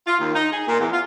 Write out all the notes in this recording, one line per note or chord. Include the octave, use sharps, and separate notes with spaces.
F4
D#2
D#4
G#4
A#2
E2
F4